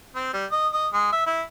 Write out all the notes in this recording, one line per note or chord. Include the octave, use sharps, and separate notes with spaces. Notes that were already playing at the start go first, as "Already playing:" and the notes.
C4
G3
D#5
D#5
G#3
E5
E4